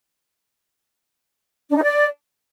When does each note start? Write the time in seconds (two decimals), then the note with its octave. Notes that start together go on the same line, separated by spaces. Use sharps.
1.70 D4
1.76 D#4
1.83 D5